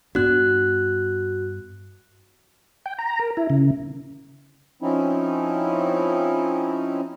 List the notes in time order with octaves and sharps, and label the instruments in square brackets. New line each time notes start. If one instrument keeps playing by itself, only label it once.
[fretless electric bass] G2 B3 D4 [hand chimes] F#4 F#6
[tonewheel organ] G5
A#5
A#4
E4
C#3
[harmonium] F3 C4 C#4 D#4 E4